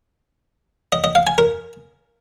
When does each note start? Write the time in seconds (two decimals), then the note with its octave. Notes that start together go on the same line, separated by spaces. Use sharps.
0.92 D#5
1.04 D#5
1.15 F5
1.27 G#5
1.38 A#4